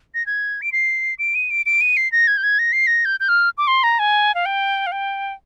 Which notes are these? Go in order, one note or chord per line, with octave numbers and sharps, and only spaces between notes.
A#6
G#6
D7
C7
D7
D#7
D7
D7
D#7
C7
A#6
G#6
G6
G#6
A#6
C7
A#6
G6
G6
F6
D6
C6
A#5
G#5
F5
G5
F5
G5